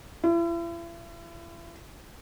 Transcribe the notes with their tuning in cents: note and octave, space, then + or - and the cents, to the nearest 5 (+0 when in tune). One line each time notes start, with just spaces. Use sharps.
E4 +40